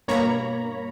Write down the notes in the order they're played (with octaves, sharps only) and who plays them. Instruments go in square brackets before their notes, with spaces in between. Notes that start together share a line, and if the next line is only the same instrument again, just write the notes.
[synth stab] G2 B2 A#3 C#5 A#5 B5